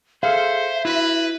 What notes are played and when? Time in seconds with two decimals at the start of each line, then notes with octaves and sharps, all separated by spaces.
0.23 G#4 A4 C5 E5 F5
0.85 E4 F#4 B4